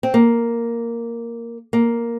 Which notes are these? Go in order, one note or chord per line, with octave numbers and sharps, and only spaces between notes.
C4
A#3
A#3